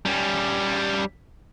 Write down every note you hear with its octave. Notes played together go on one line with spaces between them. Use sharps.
G3 C#4